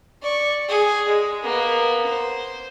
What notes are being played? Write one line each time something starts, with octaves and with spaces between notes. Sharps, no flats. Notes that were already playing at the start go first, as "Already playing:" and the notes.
D5 C#6
G#4
G#3
A#3 B3
C5